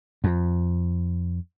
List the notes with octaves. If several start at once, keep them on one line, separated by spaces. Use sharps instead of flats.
F2